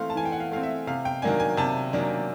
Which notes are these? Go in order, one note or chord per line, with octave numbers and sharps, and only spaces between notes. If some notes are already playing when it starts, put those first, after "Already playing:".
Already playing: E3 A3 C4 F5 C6
A5
E3 G#5
G5
F#5
F5
A3 C4 F5
E5
C3 F5
G5
D#3 F#3 A#3 D4 G#5
G#5
C3 A5
D#3 F#3 A#3 D4